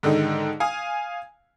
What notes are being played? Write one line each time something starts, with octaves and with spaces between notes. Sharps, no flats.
G#2 D3 D#3 D#4
F5 G#5 D#6